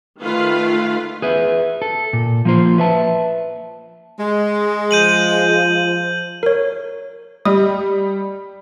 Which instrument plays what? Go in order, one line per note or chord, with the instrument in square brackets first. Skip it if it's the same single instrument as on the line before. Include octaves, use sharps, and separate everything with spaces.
[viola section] D#3 A3 F4 B4 F5
[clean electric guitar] G#4 B4 E5
A4
A#2
F3 A#3 F4 C5
B4 E5 A5
[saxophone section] G#3
[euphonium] F3 [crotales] G6 D#7 F#7
[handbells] A#4 C#5
[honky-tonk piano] G3 [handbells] D#5 D#6